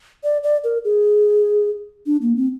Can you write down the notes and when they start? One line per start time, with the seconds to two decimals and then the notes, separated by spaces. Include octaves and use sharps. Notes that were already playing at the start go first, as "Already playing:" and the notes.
0.24 D5
0.43 D5
0.64 A#4
0.85 G#4
2.06 D4
2.22 A#3
2.36 C4